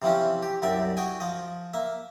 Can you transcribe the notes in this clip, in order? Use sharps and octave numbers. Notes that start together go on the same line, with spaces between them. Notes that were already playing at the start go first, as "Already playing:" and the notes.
C3 E3 F3 C4 C#4
G4
C2 F#2 G4 D5 E5
F#4 D#5 G5 G#5
F3 D#5
A#3 E5